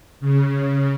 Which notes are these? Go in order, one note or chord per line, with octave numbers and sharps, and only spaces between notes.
C#3